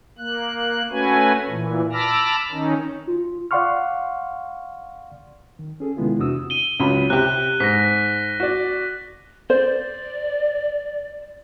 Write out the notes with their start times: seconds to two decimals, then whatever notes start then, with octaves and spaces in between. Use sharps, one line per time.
0.18 A#3 F#6
0.91 A3 C#4 F#4 B4 G#5
1.49 A#2 E3
1.92 A5 B5 D6 E6 F6 A#6
2.52 D#3 C#4 D#4
3.07 F4
3.51 D5 F5 F#5 C6 C#6 F6
5.59 D#3
5.80 C#4 G#4 A4
5.97 C3 D#3 G#3 B3 E4 F4
6.18 E2 C3 D4 F#4 D#6 E6
6.50 D#7 G7
6.80 C#2 F#3 B5
7.10 C3 G4 F#6
7.60 G#2 A#6 B6
7.74 A#6
8.40 F#4 D5
9.50 C5 D5